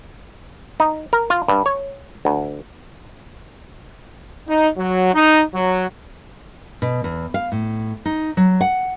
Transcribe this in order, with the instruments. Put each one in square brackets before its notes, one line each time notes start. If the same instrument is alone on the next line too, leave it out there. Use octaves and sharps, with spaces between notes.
[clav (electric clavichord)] D#4
A#4
F4
G2
C#5
D2
[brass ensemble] D#4
F#3
D#4
F#3
[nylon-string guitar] B2
E2
F5
A2
D#4
F#3
F#5